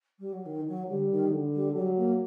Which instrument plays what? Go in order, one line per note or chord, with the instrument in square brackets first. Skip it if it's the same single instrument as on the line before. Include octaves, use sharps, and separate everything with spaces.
[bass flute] G3
F#3
D#3
F#3
[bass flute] D3 [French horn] G3
[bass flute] D#3
[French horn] D3
[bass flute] G3
[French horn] F#3 [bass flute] G3
[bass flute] A#3